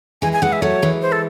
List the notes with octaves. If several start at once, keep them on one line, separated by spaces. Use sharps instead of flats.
E3 G#3 G#5
G#5
E3 G#3 F#5
E5
F#3 A3 C#5
E3 G#3
C5
A4